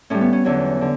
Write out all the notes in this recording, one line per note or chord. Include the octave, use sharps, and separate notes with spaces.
A2 G3 C#4
B3
C#4
E2 D3 F#3 C#4
D3